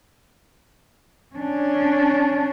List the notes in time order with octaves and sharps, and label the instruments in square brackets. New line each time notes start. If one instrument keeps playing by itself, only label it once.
[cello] C#4 D4